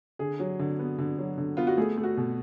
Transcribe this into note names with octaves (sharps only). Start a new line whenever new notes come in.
D3 G#4
F#3
D3
B3
D3
F#3
D3
B3 F4
F#4
A3 G#4
A3
F#4
B2